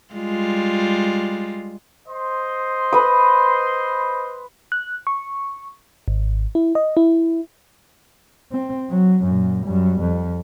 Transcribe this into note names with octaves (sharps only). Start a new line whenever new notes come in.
G3 G#3 F4
C5 D#5 C6
B4 D#6
F#6
C#6
G#1
E4
D#5
E4
C4
F#3
F#2 A#2
F#2 G3
F2